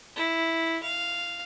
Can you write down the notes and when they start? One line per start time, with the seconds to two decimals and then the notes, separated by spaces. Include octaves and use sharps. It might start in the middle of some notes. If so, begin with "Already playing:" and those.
0.16 E4
0.83 F5